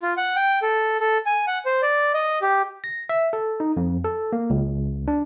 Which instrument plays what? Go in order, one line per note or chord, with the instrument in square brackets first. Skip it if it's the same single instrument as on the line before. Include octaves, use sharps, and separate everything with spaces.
[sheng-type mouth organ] F4
F#5
G5
A4
A4
G#5
F#5
C5
D5
D#5
G4
[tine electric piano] A#6
E5
A4
D#4
F2
A4
A#3
C#2
D4